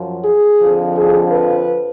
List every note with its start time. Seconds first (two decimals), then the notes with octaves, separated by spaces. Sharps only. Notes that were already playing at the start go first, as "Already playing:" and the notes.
Already playing: F#2 F3
0.25 G#4
0.60 F2 D3 F3
0.96 G#4
1.31 B4